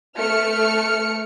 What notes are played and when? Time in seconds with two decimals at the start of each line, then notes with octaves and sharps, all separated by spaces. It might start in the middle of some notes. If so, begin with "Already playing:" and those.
0.16 A3 F6 C#7